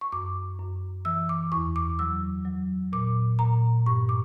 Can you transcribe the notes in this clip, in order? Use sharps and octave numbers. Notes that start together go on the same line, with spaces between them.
C#6
F#2 D6
F#2
E3 E6
D6
E2 C#6
D6
F#3 E6
F#3
A#2 D6
A#2 A#5
G2 C#6
D6